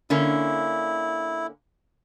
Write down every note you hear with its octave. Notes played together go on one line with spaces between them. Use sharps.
D3 A#3 C#4 E4